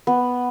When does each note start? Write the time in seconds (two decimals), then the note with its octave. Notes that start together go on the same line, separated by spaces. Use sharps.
0.07 B3